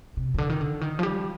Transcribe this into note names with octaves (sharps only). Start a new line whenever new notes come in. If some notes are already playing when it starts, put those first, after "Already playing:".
C3
C3
D3
D#3
D3
D#3
F3
G3